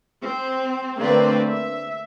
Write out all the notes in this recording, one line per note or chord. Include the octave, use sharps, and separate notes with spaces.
C4
D3 A3 A#3 C4 B4 D5
E5